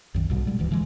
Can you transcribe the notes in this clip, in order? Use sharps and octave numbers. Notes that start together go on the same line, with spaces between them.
B1 F#2 D#3
B1 G#2 B2 G3
A#2 G3 G#3
D1 D2 E3
D3 E3 F3 G#3